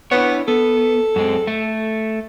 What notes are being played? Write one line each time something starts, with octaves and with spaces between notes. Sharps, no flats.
B3 D4 E4 C#5
B3 A4
F#2 G#3 C4
A3